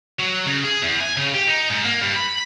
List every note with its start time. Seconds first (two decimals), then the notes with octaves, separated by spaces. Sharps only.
0.20 F#3
0.47 C#3
0.64 G#4
0.82 E2
1.00 G#5
1.17 C#3
1.34 G4
1.48 D#4
1.70 G#2
1.85 A#3
2.01 G2
2.16 B5